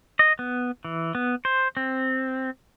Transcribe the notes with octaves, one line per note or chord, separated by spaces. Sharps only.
D#5
B3
E3
B3
C5
C4